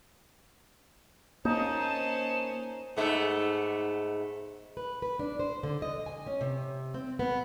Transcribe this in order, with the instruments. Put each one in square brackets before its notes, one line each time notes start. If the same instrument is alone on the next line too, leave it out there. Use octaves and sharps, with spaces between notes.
[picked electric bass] A#3 [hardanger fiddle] C#4 C5 [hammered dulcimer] D#4 [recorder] A5
[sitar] G#2 A3 B3
[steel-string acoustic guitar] B4
B4
D4
C5
D3
D#5
G#5
C#4
C3
C4
B3